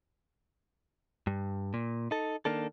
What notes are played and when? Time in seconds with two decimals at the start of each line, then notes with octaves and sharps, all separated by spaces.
1.27 G2
1.74 A#2
2.11 D#4 A4
2.45 D#3 A#3 D4 A4